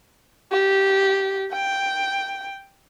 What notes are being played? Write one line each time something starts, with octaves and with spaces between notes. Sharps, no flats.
G4
G5